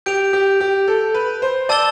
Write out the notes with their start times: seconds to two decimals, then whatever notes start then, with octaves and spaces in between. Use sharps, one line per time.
0.06 G4 G6 D7 F7
0.33 G4
0.61 G4
0.88 A4
1.14 B4
1.42 C5
1.69 D5 A5 E6 A6 E7 G7